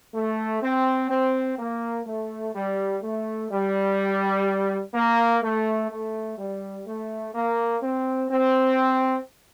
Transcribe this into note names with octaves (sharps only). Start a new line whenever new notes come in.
A3
C4
C4
A#3
A3
G3
A3
G3
A#3
A3
A3
G3
A3
A#3
C4
C4